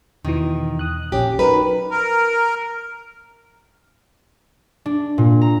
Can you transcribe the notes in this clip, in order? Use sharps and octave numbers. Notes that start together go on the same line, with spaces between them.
E2 B2 D#3 E3
D#6 F#6
A#1 C#4 G4
F#3 D#4 A#4 B4
A#4
D4
A#2
A#5